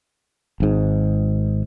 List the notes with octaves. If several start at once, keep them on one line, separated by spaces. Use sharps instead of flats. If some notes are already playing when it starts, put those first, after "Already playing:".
G#1 G#2